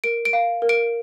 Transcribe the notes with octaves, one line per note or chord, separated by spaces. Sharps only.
A#4 D7
D7
F5
A#4
D7